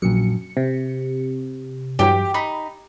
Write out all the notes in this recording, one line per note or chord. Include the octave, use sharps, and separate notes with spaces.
A#1 F#2 C#7
C3
G2 E3 F#3 G4
D#4 B5